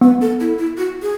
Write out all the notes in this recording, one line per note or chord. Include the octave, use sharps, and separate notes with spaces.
B3 B4
A4
E4
E4
F#4
G#4